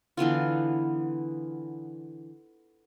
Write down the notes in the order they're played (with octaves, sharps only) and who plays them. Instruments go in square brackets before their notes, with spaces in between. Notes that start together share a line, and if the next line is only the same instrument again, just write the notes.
[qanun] D3 E3 B3 F4